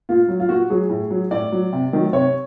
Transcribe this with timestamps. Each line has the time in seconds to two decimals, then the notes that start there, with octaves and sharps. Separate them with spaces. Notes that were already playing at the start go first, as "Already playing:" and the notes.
0.09 A#2 F4
0.29 F#3
0.40 F4
0.49 A#2 F#4
0.70 F#3 G#4
0.90 A2
1.10 F#3
1.31 A2 D5
1.52 F#3
1.73 C3
1.93 D#3 F#3
2.13 C3 C#5